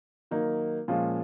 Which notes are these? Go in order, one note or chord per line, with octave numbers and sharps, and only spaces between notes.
D#3 F#3 A#3 D#4
A#2 F3 G#3 C#4